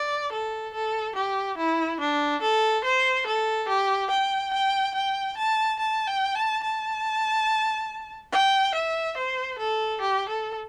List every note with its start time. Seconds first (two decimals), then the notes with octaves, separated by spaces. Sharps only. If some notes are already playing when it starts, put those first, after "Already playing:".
Already playing: D5
0.32 A4
0.74 A4
1.16 G4
1.58 E4
2.01 D4
2.42 A4
2.84 C5
3.26 A4
3.68 G4
4.11 G5
4.53 G5
4.95 G5
5.37 A5
5.79 A5
6.07 G5
6.35 A5
6.63 A5
8.32 G5
8.74 E5
9.17 C5
9.59 A4
10.01 G4
10.29 A4